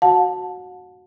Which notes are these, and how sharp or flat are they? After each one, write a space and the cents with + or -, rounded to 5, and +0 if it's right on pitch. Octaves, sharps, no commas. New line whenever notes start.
F#4 +0 F#5 -40 A5 +0